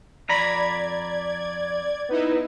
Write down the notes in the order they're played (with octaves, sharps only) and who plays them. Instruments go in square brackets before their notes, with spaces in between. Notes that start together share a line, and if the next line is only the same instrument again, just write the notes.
[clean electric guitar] F2 A#5 B5 [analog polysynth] D5 G#6
[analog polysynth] B3 D#4 E4